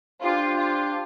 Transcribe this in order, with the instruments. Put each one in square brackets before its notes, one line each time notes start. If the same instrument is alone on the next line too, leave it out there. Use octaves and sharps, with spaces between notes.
[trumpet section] D4 G4 C5 [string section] F4
[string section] F4